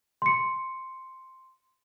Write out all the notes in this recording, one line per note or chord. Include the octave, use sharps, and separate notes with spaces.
C6 C#7